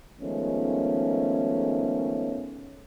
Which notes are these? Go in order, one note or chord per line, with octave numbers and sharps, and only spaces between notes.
D#3 F3 G#3 A3 B3 C#4